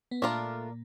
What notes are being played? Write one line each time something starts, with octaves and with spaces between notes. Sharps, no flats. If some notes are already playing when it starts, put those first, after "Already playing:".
B3
A#2 A3 A#3 D4 F4 A#4 D5